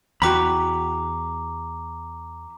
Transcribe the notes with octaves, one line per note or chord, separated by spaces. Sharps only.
E2 F#4 G5 A#5 B5 D6